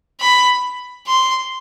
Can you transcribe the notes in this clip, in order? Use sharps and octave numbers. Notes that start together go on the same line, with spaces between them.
B5
C6